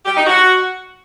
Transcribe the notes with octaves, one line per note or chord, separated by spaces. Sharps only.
G4
D#4
F#4